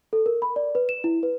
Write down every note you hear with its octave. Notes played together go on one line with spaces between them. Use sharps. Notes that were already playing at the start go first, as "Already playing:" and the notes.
A4
A#4
B5
D5
B4
E7
E4
B4